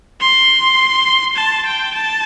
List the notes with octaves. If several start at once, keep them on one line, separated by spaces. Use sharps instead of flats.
C6
A5
G5
A5